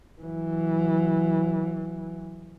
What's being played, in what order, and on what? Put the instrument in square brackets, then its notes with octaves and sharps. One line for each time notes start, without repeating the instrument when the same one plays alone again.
[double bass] E3 F#3